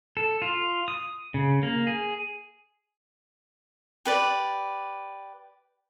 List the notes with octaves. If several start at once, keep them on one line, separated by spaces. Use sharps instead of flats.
A4
F4
D#6
C#3
A#3
G#4
G4 B4 D5